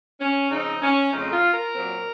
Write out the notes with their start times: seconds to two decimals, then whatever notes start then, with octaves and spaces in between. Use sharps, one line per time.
0.20 C#4
0.50 C#3 F3 C4 D#4
0.81 C#4
1.12 F2 C#3 A3 C4 D#4
1.32 F4
1.53 A#4
1.74 A#2 F#3 C4